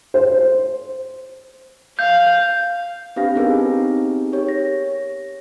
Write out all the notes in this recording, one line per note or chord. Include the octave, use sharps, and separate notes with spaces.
C5
F5 G6
C4 D4 G4 B4 F5 A#6
B3 C4 D#4 G4 G#4 A#4
G4 C#5
A#6